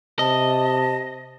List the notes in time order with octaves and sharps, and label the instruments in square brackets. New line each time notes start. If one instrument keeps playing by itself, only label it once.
[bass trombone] C3 [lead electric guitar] D#5 [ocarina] A5